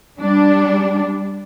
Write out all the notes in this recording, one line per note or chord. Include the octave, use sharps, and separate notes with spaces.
G3 D4